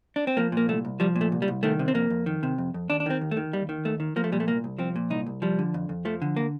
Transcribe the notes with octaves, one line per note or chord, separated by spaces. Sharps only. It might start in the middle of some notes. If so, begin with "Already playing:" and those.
D4
C4
F3 A#3
A#2 A#3
C2 A3
C2
F3 G3
A#2
A3
C2
G3
C2
D#3 A3
C3
C4
F2 A#3
F2
D#3
C3
F2
F2
D#2 D4
D4
D#3 C4
D#2
A3
D#3
D#2 G3
D#3
D#2 A3
D#3
F3 A#3
A3
A#2 G3
A3
C2 A#3
C2
F3 C4
A#2
C2 D#4
C2
F3 G3
D3
F2
F2
F3 A3
D3
A#3